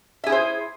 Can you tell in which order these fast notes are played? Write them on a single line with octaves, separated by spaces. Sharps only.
E5 G#4 E4 C5